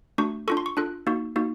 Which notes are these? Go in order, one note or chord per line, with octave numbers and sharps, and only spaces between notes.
A3 D4 F#4 C#6
D4 F4 A4 C#6
C6
C#6
D4 F4 A4 F#6
A#3 D#4 F#4
A#3 D#4 F#4